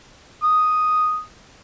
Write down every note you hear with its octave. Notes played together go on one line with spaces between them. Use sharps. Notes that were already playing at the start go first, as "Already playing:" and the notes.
D#6